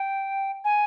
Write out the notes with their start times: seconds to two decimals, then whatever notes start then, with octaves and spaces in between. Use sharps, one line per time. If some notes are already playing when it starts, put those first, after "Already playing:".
Already playing: G5
0.64 G#5